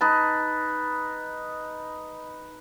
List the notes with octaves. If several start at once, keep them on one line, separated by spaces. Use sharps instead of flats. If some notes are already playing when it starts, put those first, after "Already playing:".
D#4 B4 A5